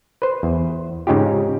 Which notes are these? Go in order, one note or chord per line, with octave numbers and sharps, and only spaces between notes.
B4 C5
E2
G#2 C#3 C#4 D#4 F4 G4